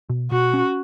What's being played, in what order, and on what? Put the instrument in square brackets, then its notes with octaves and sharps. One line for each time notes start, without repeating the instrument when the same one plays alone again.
[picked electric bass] B2
[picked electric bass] B2 [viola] F#4
[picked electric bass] C#4